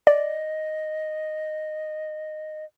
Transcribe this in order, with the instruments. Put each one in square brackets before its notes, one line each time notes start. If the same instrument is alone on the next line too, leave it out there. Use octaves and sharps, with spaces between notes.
[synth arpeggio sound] D5 [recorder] D#5